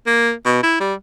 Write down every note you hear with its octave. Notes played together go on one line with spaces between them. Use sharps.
A#3
B2
E4
G3